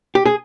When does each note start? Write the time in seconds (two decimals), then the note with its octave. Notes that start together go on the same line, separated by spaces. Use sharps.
0.15 G4
0.25 G#4